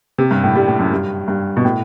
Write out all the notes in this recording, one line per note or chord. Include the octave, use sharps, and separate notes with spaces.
C3
G2
A2
G3
A2
F#2
G2
G2
B2
A2